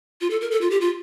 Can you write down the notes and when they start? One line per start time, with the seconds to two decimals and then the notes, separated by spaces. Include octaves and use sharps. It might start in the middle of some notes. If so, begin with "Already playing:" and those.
0.21 F4
0.30 A4
0.41 A#4
0.51 A4
0.61 F4
0.71 G4
0.81 F4